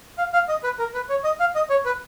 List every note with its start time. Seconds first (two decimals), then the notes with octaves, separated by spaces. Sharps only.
0.18 F5
0.33 F5
0.48 D#5
0.64 B4
0.79 A#4
0.94 B4
1.09 C#5
1.24 D#5
1.40 F5
1.55 D#5
1.70 C#5
1.85 B4